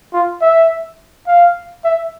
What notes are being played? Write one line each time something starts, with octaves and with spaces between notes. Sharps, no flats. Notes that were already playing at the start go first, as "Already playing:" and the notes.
F4
E5
F5
E5